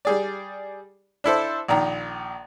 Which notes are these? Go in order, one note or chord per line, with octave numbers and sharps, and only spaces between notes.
G3 G#4 D5
D4 E4 A4 C5
A#1 A#2 D#3 A#5